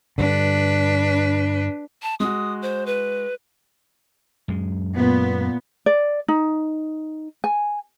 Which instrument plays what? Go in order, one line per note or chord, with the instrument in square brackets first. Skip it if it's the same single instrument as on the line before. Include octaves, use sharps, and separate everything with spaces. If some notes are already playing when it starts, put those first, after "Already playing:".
[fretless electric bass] G2 D3 [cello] D4 B4
[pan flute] A5
[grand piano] G#3 F#4 [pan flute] D#6
[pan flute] C5
B4
[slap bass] F#2 G#3
[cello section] A#2 B3
[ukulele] D5
D#4
G#5